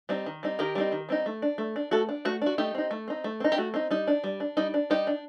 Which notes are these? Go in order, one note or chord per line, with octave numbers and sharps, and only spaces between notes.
G3 C4 D#4
D#3
G3 C4 D#4
D#3 G4 A#4
G3 C4 D#4
D#3
G3 C4 D#4
A3
D4
A3
D4
A3 F#4 A4
D4
A3 F#4
D4 F#4
A3 D#4 G4
C4 D#4
A3
C4 D#4
A3
C4 D#4
G4
A3 F#4
C4 D#4
G3 D#4
D4
G3
D4
G3 D#4
D4
G3 D#4 G4
D4